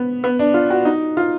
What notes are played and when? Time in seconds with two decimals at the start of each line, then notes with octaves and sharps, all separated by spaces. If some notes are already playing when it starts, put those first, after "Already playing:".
Already playing: B3
0.24 B3
0.39 D4
0.54 F4
0.70 F#4
0.85 D#4
1.17 F4